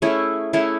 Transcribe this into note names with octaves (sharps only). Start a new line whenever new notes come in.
A3 C#4 E4 G#4
A3 C#4 E4 G#4